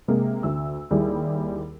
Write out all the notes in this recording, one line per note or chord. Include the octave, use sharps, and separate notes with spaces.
C3 G#3 A#3
D2 E6
D#2 G3 E4 G#4